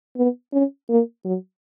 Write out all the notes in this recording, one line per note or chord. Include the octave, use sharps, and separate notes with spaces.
B3
C#4
A#3
F#3